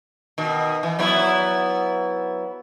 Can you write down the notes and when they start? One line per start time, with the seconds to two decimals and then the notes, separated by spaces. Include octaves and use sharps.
0.38 B2 D#3
0.83 E3
0.99 F#3 B3 E4